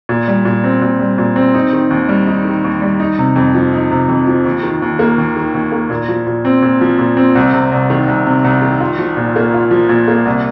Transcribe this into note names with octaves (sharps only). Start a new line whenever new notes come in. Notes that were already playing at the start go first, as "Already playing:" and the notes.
A#2
G3
A#2
C4
A#2
G3
A#2
C4
D#4
D#3
D#2
G3
D#4
D#3
D#2
G3
D#4
C3
F2
F3
D#4
C3
F2
F3
D#2
D#3
D#2
A#3
D#2
D#3
D#2
A#3
A#2
F3
A#2
C4
A#2
F3
A#2
C4
C2
C3
C2
D#3
C2
C3
C2
D#3
F4
F3
A#2
A#3
F4
F3
A#2
A#3
C2